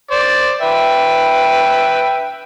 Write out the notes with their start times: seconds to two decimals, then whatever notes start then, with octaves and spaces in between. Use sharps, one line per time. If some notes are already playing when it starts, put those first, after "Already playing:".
0.11 C5 D5
0.61 B4 E5 G5